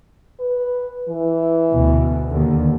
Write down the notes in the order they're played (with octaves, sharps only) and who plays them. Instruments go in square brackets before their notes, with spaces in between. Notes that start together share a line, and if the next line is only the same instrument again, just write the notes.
[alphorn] B4
E3
[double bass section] D2 B2
D#2 D3